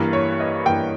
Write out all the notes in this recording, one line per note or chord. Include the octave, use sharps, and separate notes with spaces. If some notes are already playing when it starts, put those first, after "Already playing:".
Already playing: G2 E3 A#3 B4
C#5
D#5
G2 E3 A#3 G5